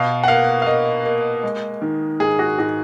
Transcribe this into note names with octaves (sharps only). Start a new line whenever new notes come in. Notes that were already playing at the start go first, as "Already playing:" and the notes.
Already playing: B2 F5
F#5
A#3 F5
F5
A#3 D#5
A#3
G#3
D#3
G#2 G#4
F#4
G#2 F#4